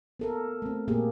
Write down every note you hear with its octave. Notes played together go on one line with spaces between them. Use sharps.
B3 A4 A#4
A3 C4
A#2 A#3 G4 G#4